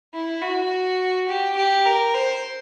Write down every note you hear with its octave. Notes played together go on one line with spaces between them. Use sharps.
E4
F#4
G4
G4
A#4
C5